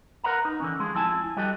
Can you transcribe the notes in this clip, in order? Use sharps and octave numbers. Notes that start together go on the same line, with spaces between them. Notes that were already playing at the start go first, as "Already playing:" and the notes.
A#4 B4 F5 F#5 A#5
D#4
D3 E3 C#4
F3 G#3 G#4
F2 F3 E4 G#5 A5
G3 F#4 G4 A4 D#5